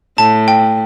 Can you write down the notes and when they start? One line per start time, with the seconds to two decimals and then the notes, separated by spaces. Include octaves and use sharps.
0.18 A2 A5
0.48 G5